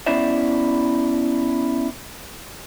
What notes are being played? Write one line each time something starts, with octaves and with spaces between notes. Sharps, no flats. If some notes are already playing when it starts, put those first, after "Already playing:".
B3 C#4 E4 C5 D5 E5